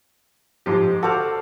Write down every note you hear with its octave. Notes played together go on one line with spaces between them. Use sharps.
G#2 F3 G4
F#4 A4 C5 F5 D6